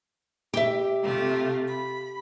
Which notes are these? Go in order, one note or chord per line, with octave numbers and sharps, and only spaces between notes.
G4 E5
C3 A3 F4
B5